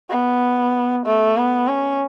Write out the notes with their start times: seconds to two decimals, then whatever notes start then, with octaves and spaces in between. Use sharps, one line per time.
0.10 B3
1.06 A3
1.37 B3
1.68 C#4